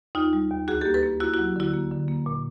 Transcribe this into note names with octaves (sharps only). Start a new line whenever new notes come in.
D#2 D#4 F4
G3
D#2
D2 F#4 G#4
A#3 G4 A4
A4 B4
A#3
A#3 E4 F#4
F#3 E4 F#4
D3 E4 F#4
A#3
D3
A#3
A#2